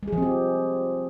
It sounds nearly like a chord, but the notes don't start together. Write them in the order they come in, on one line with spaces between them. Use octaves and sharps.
G#3 G#4 F3 C4 G4